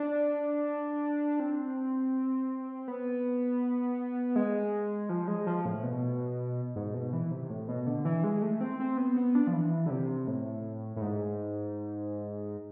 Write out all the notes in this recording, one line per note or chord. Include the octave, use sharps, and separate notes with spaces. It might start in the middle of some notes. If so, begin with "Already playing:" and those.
Already playing: D4
C4
B3
G#3
F3
G#3
F3
A2
B2
G#2
B2
E3
C3
A2
B2
D3
E3
G#3
A3
C4
C4
B3
B3
D4
F3
E3
D3
C3
A2
A2
G#2